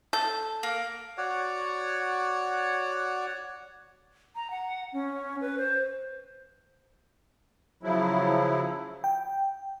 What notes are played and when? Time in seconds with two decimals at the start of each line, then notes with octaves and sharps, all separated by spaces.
0.13 A4 G6
0.63 A#3
1.18 F#4 C#5 D5 F#5
4.35 A#5
4.51 F#5
4.93 C#4
5.41 B4
5.58 C5
7.83 C#3 F3 F#3 E4
9.04 G5